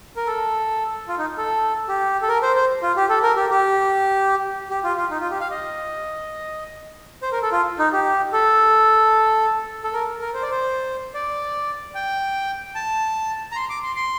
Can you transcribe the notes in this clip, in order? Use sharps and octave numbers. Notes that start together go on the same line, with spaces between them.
A#4
A4
F4
D#4
A4
G4
A4
A#4
C5
C5
F4
G4
A4
A#4
G4
G4
G4
F4
F4
D#4
F4
G4
F5
D#5
C5
A#4
A4
F4
D#4
G4
A4
A4
A#4
A#4
C5
D5
C5
D5
G5
A5
A#5
C6
D6
C6
C6